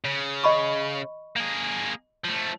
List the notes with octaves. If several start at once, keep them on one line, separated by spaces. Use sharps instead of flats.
C#3
D#5 B5 C#6
A#3 G#4
F3 A3